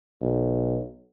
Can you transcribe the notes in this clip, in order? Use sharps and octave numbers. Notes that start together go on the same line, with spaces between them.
B1